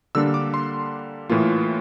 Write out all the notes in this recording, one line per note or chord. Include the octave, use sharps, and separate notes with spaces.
D3 G3 A#3 D4 E6
D6
C6
A2 E3 A#3 F4